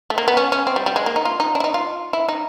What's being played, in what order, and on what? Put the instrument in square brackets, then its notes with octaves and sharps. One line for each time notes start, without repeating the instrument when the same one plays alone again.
[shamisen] A3
A#3
B3
C#4
C#4
C4
G3
G3
G#3
A#3
D#4
F4
D#4
D4
E4
D#4
F4
E4
D#4